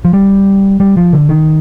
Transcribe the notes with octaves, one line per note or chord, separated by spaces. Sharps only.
F3
G3
G3
F3
D3
D#3